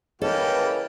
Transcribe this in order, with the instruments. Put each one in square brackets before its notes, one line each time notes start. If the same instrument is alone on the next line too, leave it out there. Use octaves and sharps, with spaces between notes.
[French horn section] C#3 E3 B4 [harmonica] A#3 G4 [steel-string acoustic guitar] A4 [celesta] C#5 D#5